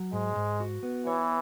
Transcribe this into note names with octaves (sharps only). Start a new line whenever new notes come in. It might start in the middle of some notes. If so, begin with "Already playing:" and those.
Already playing: F#3
G#2 G#3
G#2
F#4
B3
E3 C#5